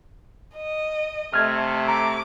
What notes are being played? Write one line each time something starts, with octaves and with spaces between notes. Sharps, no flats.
D#5
C3 A3 F6 G#6
A#5 D6